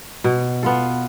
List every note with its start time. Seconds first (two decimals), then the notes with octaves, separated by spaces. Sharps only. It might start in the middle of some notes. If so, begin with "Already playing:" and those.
0.24 B2
0.63 B3 F4 A4